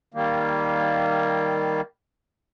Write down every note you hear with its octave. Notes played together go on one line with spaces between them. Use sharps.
D#3 G3 A#3